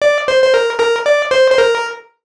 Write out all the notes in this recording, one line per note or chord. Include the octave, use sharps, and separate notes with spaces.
D5
C5
C5
A#4
A#4
D5
C5
C5
A#4